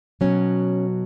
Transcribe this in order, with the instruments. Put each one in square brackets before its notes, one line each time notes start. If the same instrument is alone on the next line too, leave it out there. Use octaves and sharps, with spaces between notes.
[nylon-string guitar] B2 F#3 C#4